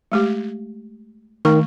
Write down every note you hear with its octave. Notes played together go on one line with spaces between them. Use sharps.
G#3 A3 G4
D#3 A3 A#5 C#6